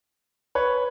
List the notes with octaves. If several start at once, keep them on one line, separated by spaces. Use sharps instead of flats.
B4 C#5